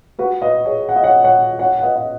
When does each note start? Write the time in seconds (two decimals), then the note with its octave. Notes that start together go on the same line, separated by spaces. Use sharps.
0.19 F#4 B4
0.42 B4 D#5
0.65 G#4 C#5
0.89 F#5
0.96 D#5
1.03 C#5 F#5
1.24 C#5 F#5
1.59 C#5 F#5
1.78 F#5
1.83 B4 D#5
1.96 D#5